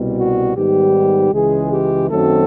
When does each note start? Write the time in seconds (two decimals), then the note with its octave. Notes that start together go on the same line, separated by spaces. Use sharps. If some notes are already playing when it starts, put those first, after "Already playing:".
Already playing: C2 B2 G3
0.18 F#4
0.57 G#2 D#3 G3 B3 G4
1.33 C#2 C#3 E3 G#3 G#4
1.72 G4
2.10 F#2 D#3 F#3 A3 C4 A4